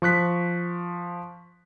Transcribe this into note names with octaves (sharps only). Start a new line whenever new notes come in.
F3 C#6 F#6 B6